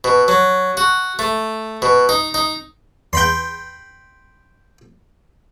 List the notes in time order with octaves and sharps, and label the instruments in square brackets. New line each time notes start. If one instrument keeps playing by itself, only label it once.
[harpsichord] B2
F#3
F#4
A3
B2
D#4
D#4
[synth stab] E2 G6 [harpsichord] G5 B5 C6